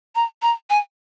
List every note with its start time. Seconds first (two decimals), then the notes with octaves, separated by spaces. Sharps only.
0.15 A#5
0.42 A#5
0.70 G#5